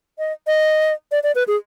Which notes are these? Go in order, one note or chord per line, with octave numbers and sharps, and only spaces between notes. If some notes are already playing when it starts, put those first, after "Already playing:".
D#5
D#5
D5
D5
B4
G#4